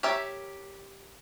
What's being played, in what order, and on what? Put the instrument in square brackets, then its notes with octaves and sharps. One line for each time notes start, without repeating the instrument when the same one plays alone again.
[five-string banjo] G4 A#4 C#5 E5